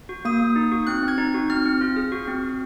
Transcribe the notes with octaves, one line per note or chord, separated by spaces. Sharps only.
F#4
A#3 D#6
A#3
D#4
F#4
C4 F#6
C4
G#6
D#4
F#4
C4 F6
C4
F4
G#4
F#4
C4
F#4